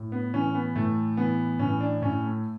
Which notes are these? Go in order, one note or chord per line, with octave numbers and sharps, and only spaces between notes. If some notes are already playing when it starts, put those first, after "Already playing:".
Already playing: A2
B3
E3 C#4
B3
A2 A3
E3 B3
A2 C#4
D4
A2 C#4
A3